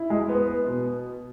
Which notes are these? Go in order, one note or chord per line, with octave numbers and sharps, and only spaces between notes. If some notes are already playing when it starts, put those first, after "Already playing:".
Already playing: E4
G#3
B3
B3
B2